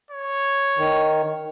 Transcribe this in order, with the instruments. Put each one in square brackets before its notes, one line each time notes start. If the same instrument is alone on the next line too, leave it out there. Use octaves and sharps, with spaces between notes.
[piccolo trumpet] C#5
[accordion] D#3